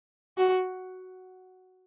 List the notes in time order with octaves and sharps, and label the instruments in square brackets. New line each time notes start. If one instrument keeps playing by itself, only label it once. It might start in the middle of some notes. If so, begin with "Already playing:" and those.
[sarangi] F#4